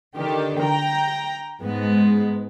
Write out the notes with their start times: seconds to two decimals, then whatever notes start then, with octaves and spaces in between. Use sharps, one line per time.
0.16 D3 D#3 G4
0.61 G5 A#5
1.60 G#2 G#3 B3